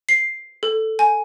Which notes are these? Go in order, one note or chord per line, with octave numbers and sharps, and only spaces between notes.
C7
A4
G#5